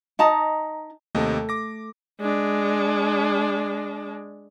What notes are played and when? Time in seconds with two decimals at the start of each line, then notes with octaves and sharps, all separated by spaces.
0.19 D#4 D#5 A5 A#5
1.15 D#2 C3 A3 A4 D#5
1.49 D6 A#6
2.20 G#3 D4